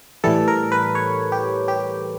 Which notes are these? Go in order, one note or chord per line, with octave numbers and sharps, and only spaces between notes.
A2 E3 G3 A4
A#4
B4
C#5
G4
G4